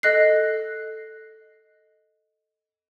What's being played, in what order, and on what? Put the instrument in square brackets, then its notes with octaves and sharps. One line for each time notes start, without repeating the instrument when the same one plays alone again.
[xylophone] A4 D#5 F#6 C7